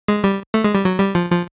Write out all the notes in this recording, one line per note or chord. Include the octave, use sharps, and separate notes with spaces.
G#3
G3
A3
G#3
G3
F#3
G3
F3
F3